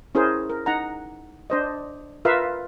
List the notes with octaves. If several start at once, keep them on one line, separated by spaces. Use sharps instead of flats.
C#4 E4 G#4 A#4 C5
A#4
D#4 F#5 A#5
D4 C5 D#5
F4 A#4 B4 E5 F5